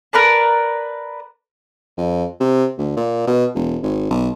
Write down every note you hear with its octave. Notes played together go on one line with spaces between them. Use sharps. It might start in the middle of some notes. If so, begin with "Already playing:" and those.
A#4 B4 D5 A5
F2
C3
D2
A#2
B2
E1
G#1
B1